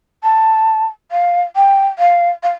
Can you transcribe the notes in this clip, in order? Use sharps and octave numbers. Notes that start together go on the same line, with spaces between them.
A5
F5
G5
F5
F5